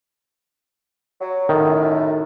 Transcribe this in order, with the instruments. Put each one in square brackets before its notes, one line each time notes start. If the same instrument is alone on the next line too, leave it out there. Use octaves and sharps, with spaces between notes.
[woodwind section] F#3
[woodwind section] F#2 A2 [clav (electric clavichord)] D#3